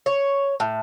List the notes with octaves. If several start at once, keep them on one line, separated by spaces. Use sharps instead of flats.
C#5
A2